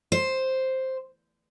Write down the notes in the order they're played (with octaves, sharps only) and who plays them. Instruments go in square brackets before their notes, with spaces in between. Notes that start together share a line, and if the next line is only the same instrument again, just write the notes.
[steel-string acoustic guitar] C5